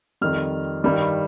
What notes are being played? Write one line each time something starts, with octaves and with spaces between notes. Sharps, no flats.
F2 D#3 G3 F6
G2 D#3 G3